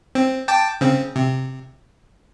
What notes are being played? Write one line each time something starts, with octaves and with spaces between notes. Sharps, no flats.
C4
G5 A5 D6
C#3 C4
C3